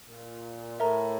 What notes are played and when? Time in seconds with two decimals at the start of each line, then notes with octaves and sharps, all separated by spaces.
0.08 A#2
0.80 A2 A#4 E5 A#5